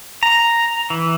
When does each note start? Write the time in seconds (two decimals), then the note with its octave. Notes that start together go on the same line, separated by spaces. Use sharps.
0.23 A#5
0.90 E3